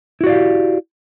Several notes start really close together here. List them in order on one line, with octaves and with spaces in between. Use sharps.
E4 F#4 D5 F5 G4